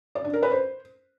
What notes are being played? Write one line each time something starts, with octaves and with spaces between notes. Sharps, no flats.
D5
D4
A#4
B4
C5